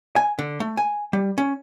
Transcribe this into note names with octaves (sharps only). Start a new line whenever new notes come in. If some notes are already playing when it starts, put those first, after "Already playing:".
G#5
D3
A3
G#5
G3
C#4